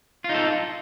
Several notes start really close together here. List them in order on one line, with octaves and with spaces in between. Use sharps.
F4 D#4 A4